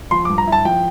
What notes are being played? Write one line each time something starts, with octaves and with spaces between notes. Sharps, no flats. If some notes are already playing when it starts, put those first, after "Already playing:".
F3 C6
G2 D6
A#5
E4
A5
F3 G5